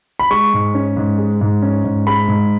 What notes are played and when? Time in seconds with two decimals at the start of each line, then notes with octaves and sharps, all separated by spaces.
0.19 B5
0.31 G#3 C#6
0.54 G#2
0.74 C#4
0.97 G#2
1.18 G#3
1.41 G#2
1.62 C#4
1.85 G#2
2.07 G#3 B5
2.28 G#2